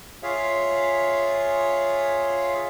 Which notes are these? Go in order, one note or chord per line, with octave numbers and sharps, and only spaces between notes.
F4 G#4 C#5 E5 F5